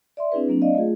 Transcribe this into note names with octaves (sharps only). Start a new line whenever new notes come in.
D5 E5 C6
C4 D4 E4 G#4 B4
F#3 A#3 C4 D4
D5 D#5 F5
A3 F4 G#4